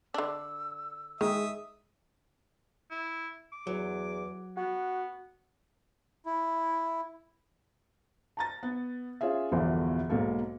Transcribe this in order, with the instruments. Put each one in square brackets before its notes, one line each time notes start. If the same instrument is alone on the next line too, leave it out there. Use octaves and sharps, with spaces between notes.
[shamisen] D3 D4 [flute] E6
[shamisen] D#3 [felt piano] G#3 [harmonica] E5 D#6
[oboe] E4
D6
[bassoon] E2 [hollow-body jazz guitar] F#3
[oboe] B3 [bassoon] F#4
[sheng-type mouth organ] E4
[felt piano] A5 A#5 A6
B3
C#4 F4 G#4 E5
G1 E2 B2 D3 E3 F3
B1 G#2 A#3 A4